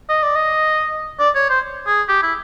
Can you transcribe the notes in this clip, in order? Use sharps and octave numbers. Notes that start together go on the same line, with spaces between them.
D#5
D5
D#5
D5
C#5
C5
G#4
G4
E4